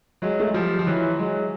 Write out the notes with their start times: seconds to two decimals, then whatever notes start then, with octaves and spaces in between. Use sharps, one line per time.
0.22 F#3 G#3
0.40 A3
0.48 G#3
0.54 F3 G3
0.79 F3
0.86 E3 F#3
1.19 F#3 G#3